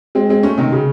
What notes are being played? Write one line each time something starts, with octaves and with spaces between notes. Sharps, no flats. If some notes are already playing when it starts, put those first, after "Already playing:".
G#3 C4
G#3 C4
A3 C#4
C3 D#3
C#3